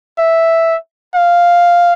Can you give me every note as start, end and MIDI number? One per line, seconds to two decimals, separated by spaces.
0.19 0.77 76
1.15 1.93 77